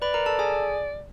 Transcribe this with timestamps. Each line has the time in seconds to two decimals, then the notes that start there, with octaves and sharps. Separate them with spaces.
0.02 B4 D5 B5
0.14 A#4 A#5
0.26 A4 A5
0.39 G#4 G#5